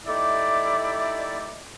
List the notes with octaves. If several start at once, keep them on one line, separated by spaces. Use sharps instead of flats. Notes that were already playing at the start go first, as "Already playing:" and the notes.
A3 D#4 E4 G4 D5